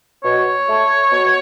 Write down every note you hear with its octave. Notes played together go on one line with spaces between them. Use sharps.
B2 C#5
A3
B2